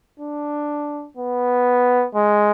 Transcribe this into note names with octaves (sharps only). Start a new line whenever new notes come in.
D4
B3
G#3